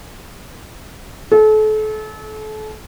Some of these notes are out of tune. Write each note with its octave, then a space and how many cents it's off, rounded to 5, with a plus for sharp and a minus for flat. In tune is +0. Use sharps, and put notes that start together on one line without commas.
A4 -35